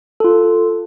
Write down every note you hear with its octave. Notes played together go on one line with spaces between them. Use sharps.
F4 A4